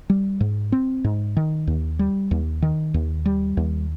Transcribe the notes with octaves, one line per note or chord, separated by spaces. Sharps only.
G3
G#2
C4
G#2
D#3
D#2
G3
D#2
D#3
D#2
G3
D#2